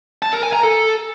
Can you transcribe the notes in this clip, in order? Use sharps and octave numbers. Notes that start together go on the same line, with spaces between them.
A5
A#4
G#5
A#5
A4